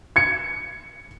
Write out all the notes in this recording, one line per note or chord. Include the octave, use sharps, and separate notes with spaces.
G#6 C#7